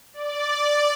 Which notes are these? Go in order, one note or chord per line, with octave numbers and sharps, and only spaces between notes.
D5